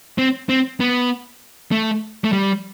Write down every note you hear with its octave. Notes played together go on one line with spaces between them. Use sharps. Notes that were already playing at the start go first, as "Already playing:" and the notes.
C4
C4
B3
A3
A3
G3